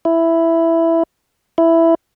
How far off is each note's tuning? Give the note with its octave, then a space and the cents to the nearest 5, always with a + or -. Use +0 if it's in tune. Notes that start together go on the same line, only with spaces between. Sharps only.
E4 +5
E4 +5